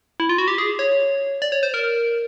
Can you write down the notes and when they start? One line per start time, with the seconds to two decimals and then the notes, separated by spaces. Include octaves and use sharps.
0.20 E4
0.29 F4
0.38 F#4
0.48 G4
0.58 G#4
0.79 C#5
1.42 D5
1.52 C#5
1.63 C5
1.74 A#4